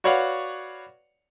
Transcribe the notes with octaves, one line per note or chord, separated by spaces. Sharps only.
F#4 B4 C#5 D5 F5 F#5